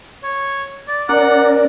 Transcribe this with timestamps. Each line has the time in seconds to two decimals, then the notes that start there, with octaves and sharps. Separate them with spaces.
0.23 C#5
0.88 D5
1.09 C#4 A#4 D5 F#5